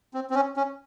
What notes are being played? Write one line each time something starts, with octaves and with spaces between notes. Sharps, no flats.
C4
C4
C#4
C#4